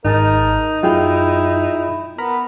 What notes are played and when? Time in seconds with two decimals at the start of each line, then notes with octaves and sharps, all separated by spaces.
0.05 G#1 D#4 G#4 A#4 A5
0.83 F#2 F#3 E4 F4 G#4 G5
2.18 B3 A#4 A#5 B5